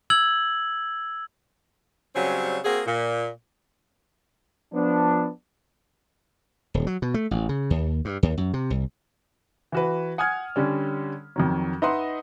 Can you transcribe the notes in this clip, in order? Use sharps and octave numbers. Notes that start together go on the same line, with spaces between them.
E6 G#6 F#7
C#3 F#3 G3 C4 C#4
A#3 C4 F#4 G#4
A#2
F3 B3 D4
D#1
F#3
B2
A3
A1
C#3
D#2
G2
D#2
F#2
C3
C2
E3 F#4 B4
F#5 G#5 D#6 F6 G#6
D3 G3 C#4
F2 D#3 F#3
D#4 B4 D#5 E5 F#5 C6